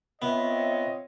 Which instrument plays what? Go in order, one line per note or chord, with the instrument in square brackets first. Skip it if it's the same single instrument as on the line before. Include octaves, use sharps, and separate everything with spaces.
[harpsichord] B3 [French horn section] C4 F4 C#5 [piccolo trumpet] D#5 [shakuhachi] E5